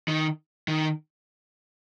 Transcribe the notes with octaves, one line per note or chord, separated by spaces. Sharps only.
D#3
D#3